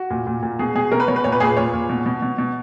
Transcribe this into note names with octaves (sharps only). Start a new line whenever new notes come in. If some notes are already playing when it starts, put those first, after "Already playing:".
Already playing: F#4
A#2
A#2
A#2
B2 G#4
B2 G#4
B2 A#4
B4
B2 C#5
B4
A#2 C#5
B4
A#2 G#4
B4
A#2 C#5
A#2
B2
B2
B2
B2